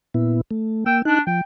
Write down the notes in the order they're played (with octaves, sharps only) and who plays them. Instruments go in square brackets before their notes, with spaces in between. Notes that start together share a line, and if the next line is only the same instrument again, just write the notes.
[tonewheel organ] A#2 B3 E4
A3
[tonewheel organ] A#3 E6 [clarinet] G5
[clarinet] D4 [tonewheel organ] D#4 F#6
[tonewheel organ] F3 [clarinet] G5